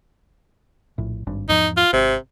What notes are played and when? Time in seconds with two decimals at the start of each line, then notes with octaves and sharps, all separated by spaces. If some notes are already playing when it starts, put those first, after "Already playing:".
0.98 A#1 A2
1.27 G#1 G2
1.49 E2 G#2 F3 D#4
1.77 F4
1.93 G#1 C3